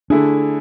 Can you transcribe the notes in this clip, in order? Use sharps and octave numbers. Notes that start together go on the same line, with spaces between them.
D3 A3 D4 E4 G#4